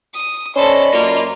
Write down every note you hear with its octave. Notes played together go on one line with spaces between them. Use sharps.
D#6
C#4 A4 C5 D5 D#5 B5
F#2 A#3 F4